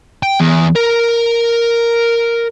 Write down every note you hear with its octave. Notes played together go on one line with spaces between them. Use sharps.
G5
E2
A#4